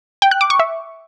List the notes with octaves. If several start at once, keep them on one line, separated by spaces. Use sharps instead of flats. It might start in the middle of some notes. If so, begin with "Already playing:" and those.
G5
F#6
D6
C#6
E5